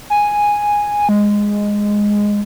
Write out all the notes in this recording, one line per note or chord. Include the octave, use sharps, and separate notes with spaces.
G#5
G#3